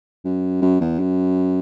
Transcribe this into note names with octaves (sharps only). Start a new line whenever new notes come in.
F#2
F#2
E2
F#2